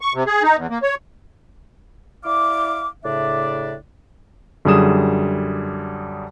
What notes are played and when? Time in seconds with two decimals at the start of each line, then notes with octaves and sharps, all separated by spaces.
0.01 C#6
0.14 C3
0.26 G#4
0.43 D#4
0.56 E2
0.70 A#3
0.83 C#5
2.24 E4 D5 F5 D6
3.04 A2 C#3 D4 D5 E5
4.65 F#2 D3 G3 G#4 D#6 E7